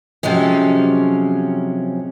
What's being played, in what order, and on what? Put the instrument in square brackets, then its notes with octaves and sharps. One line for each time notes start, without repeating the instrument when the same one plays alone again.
[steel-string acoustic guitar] C3 F3 F#3 G#3 C#4